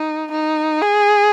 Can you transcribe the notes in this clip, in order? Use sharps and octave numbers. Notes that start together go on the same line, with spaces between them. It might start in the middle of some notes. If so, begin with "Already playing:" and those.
Already playing: D#4
D#4
G#4